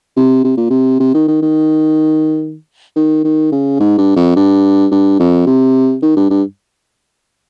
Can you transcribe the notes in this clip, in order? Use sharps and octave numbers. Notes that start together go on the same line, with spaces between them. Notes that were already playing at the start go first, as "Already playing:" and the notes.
C3
C3
A#2
C3
C3
D#3
D#3
D#3
D#3
D#3
C#3
G#2
G2
F2
G2
G2
F2
C3
D#3
G2
G2